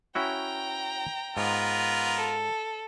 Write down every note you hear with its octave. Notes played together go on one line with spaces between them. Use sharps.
C#4 E4 F#4 G5 A#5
G#2 B3 F4 A#4
A4